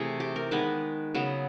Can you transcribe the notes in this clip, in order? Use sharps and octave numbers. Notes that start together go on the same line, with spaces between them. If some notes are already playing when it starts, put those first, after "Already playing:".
Already playing: C3 E3 A3 G#4
G4
A#4
D#3 G#3 B3 B4
C#3 F#3 B3